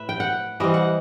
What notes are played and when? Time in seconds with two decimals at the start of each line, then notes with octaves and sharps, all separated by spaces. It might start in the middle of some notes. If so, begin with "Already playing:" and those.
Already playing: A2 B4 E5
0.09 G5
0.20 F#5
0.60 E3 G3 C4 D#5
0.74 F#5